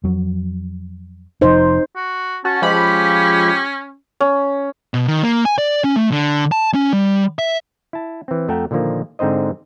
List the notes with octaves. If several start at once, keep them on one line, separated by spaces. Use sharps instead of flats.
F2 F#3
F1 F3 D#4 C5
F#4
C#4 F#4 A5
F3 G#3 G4 B5
C#4
B2
D#3
A#3
G#5
D5
C#4
A3
D3
A5
C#4
G3
E5
E4 A5
E3 C4
F2 A3 E5 F#5 G5 A#5
A#2 D3 D#3 F3 A#3
G#2 D3 C4 D#4 C5 D#5